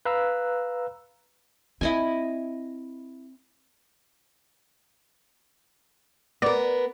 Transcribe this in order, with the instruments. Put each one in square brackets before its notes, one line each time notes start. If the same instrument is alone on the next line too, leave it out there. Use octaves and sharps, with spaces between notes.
[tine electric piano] B4 F5 A#5 E6 F#6
[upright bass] C4 [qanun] E4 D#5 G#5
[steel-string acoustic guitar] B3 A#4 [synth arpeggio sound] D5